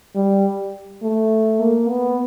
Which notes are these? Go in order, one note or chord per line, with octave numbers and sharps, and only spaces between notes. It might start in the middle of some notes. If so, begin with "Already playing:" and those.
G3
A3
A#3
B3